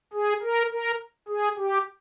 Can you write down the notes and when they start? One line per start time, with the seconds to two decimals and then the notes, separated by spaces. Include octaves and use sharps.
0.13 G#4
0.42 A#4
0.71 A#4
1.28 G#4
1.58 G4